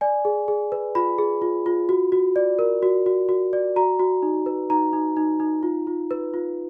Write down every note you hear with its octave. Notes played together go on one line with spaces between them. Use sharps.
D5 G#5
G#4
G#4
B4
F4 B5
G#4
F4
F4
F#4
F#4
D5
A#4
F#4
F#4
F#4
D5
F#4 A#5
F#4
D#4
B4
D#4 A#5
D#4
D#4
D#4
F4
F4
B4
F4